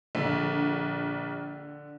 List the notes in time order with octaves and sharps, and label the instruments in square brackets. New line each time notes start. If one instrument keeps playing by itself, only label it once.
[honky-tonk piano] A#1 [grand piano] D3